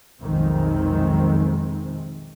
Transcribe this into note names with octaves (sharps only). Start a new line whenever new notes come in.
B1 F2 C3 D#3 G#3 C4